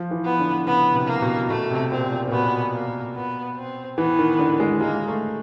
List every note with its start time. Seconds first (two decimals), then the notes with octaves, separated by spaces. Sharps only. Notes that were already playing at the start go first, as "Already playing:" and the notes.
Already playing: F3
0.11 E3
0.25 B3
0.40 D3
0.66 C#3 B3
0.94 C3
1.08 A#3
1.22 B2
1.49 B2 A3
1.70 C3
1.91 A#2 C4
2.12 A#2
2.28 A#2
2.32 B2 B3
2.73 A#3
3.15 B3
3.56 C4
3.98 E3 B3
4.19 D#3
4.39 D3
4.60 G#3
4.81 G#3 A#3
5.08 A3